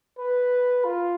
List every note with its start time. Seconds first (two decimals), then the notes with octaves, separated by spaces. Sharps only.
0.18 B4
0.84 F4